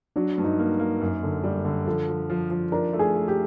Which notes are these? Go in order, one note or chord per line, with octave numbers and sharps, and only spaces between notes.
F#3 D4
G2
D#4
A#3
A#3
F#2
D3
G3
D3
F3 A4
F3
F3
F3
D4 A#4
A3
G#4
A3
G4